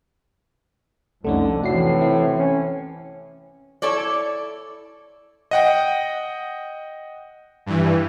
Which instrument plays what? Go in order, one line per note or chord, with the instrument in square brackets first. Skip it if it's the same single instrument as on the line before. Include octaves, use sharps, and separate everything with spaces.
[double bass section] C2 F2 [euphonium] D3 [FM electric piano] A3 C#4 D#4
[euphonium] A2 [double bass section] C3 E3 [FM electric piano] F#4 C7
[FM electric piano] E4
[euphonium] C#4
[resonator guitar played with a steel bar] E4 A4 C#5 D5
[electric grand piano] D#5 F#5 G5
[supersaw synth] G2 E3